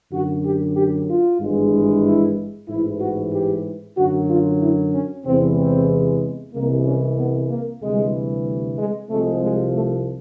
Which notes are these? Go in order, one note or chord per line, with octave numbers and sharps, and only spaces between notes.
F#2 D3 F#3 F#4
G4
G4
F4
G#1 G2 E3 G#3
E4
A1 G#2 E3 E4
F#4
G4
F#2 D3 F#3 F#4
F4
E4
C#4
E2 C3 E3 G#3 C4
C4
C2 C3 E3 G#3 A#3
C#4
B3
A#3
D2 C3 E3 G3 G#3
G#3
C2 C3 F3 G#3 A3
G#3
A3